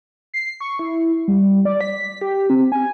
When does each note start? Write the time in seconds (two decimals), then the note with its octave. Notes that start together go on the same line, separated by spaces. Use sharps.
0.34 C7
0.61 C#6
0.79 E4
1.28 G3
1.65 D5
1.81 B6
2.21 G4
2.50 C4
2.72 G#5